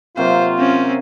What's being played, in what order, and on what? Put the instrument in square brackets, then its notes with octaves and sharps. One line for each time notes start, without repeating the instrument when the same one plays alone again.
[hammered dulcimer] C3 F#3 A#3 [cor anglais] F4 [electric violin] C5
[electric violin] C4 C#4